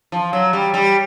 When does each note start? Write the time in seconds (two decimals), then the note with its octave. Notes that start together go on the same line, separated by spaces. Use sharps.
0.12 F3
0.33 F#3
0.53 G3
0.74 G3